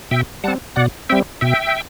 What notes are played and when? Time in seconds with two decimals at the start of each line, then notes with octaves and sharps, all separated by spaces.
0.11 B2 E5 G5
0.44 G3 C4 F#5 A5
0.76 B2 D5 F#5
1.09 G3 C4 E5 G5
1.41 B2 E5 G5